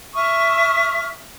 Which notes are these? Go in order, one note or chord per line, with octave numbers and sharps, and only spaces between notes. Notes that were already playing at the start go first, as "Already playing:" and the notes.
E5 C#6 D#6 F6